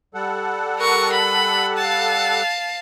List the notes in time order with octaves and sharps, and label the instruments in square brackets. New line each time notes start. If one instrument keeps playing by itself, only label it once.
[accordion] G3 A4 F#5
[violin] A#4 C#6
B5
F5 A5